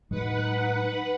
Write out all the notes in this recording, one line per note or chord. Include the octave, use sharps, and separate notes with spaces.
A2 F#3 G#3 D#4 B4 F#5
D#4